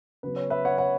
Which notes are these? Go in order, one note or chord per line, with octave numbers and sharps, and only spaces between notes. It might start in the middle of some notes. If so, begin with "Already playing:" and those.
C#3 F#3 B3 B4
C#5
B4 E5
C#5 F#5
C#5 F#5